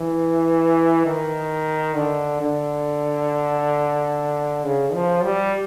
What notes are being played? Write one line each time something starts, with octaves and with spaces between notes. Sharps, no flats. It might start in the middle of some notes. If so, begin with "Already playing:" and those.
Already playing: E3
D#3
D3
D3
C#3
F3
G3